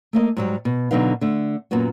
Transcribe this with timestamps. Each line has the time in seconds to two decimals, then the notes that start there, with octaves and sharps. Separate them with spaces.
0.13 A3 A#3 D#5
0.37 G#2 F#3 G3
0.65 B2
0.91 B2 D3 F#3 D#4 B4 F5
1.21 D3 A3
1.71 F#2 A#2 A#3 B3 F#4